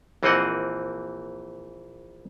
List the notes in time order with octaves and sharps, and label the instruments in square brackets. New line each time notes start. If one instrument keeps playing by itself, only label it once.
[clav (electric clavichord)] A#1 E3 A#3 C4 D#5 F#5